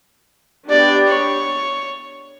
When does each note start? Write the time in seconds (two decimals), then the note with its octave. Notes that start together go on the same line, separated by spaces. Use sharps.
0.69 B3 D4 G4 D5
1.08 C#5